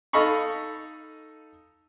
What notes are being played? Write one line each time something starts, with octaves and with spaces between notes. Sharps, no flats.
D#4 A4 D#5 F5 B5 C#6